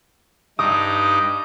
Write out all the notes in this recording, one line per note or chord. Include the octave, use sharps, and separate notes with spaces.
G2 D#4 D6 D#6